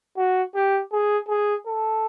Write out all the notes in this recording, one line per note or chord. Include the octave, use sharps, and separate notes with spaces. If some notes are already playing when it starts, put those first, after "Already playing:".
F#4
G4
G#4
G#4
A4